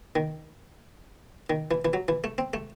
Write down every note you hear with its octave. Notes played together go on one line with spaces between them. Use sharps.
D#3
D#3
E3
E3
F#3
E3
A3
C4
A3